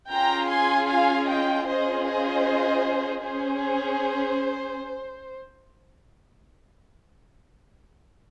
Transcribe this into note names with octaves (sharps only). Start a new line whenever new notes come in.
C#4 F4 G#4 G5 A#5
G#5 C6
F5 G#5
D#5 G5
C#4 F4 G#4 C5 D#5
C5 D#5
C#4 G#4 C5